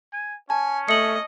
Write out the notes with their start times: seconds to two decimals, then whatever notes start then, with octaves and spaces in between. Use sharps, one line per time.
0.13 G#5
0.50 C#4 G#5 A5
0.89 A3 D#5 C#7 F#7